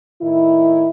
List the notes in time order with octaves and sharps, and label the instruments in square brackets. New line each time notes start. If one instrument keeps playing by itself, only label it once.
[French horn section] A2 D#3 E4